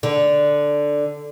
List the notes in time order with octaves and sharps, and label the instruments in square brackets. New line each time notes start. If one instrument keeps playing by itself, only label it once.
[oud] D3